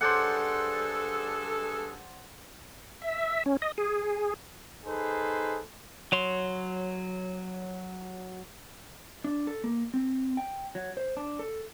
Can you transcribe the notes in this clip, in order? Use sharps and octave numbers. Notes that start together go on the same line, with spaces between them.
G2 G#4 A4 C5 D5 F#5
E5
C#4
D#5
G#4
D#4 G#4 A4 B4 C5
F#3 C#5 C6
D4
A4
A#3
C4
G5
F#3
C5
D4
A4